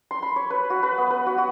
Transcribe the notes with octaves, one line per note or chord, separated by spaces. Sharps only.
C6
B5
C#5
B4
F#4
B4
B3
B4
F#4
F#4